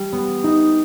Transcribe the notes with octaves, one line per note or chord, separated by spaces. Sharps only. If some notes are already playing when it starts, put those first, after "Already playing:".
Already playing: G3
B3
D#4